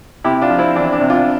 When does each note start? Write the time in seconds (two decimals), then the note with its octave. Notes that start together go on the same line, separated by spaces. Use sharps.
0.24 C3 E4 G4
0.41 D4 F4
0.50 F3
0.58 C4 E4
0.76 E2 D4
0.92 D4
1.01 C3
1.10 D4 F4